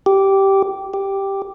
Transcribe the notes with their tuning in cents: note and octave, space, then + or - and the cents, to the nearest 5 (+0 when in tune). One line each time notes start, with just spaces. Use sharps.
G4 -10
G4 +0